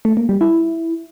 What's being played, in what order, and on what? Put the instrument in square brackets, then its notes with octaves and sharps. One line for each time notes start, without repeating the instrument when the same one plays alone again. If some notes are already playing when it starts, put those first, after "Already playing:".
[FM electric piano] A3
A#3
G3
E4